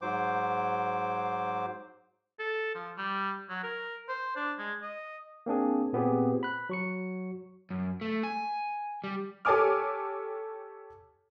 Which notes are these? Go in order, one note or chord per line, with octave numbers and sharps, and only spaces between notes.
G#2 F#3 C5 D6
A4
F3
G3
F#3
A#4
C5
D4
G#3
D#5
A#3 C4 D4 G#4
A#2 B3 C4 G4 G#4
B5 F#6
F#3 C#6 C#7
F#2
A3
G#5
G3
G4 A4 C#5 G#5 D6 F6